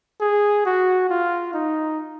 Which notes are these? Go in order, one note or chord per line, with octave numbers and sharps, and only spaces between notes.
G#4
F#4
F4
D#4